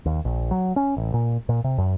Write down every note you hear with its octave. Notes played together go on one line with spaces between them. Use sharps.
D#2
A#1
F#3
C#4
A1
A#2
A#2
C3
F#2